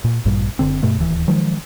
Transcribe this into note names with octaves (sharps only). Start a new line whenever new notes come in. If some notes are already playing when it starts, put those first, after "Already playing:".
A#2
A1 G2 A#2 G3
F#1 D3 C4
G2 B2 A3
D1 D#2 E3
D#3 F3 F#3 G#3